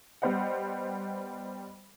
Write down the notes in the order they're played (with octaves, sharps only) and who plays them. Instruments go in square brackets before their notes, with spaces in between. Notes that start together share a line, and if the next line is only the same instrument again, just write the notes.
[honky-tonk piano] G3 B3 C5 D#5 F#5